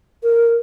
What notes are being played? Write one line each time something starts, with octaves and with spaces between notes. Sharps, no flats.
A#4